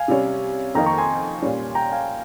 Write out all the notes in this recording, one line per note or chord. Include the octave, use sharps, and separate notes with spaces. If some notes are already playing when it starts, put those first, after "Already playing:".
Already playing: F5 G#5
C3 G3 C#4
F2 D#3 A#3 D#4 G5 A#5
A#5 C#6
G#5 C6
A#2 G3 C#4
G5 A#5
F5 G#5